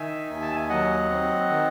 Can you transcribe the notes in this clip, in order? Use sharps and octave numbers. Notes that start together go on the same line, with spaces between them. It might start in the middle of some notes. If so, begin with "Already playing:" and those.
Already playing: D#3 D#4 E5 G#5
D#2
A5
G#5
F#3 D#5 F#5
C4
D#3